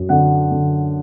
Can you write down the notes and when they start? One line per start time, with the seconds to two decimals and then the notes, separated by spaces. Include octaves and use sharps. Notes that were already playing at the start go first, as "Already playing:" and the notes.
Already playing: F#2
0.09 D3 F#5
0.52 D3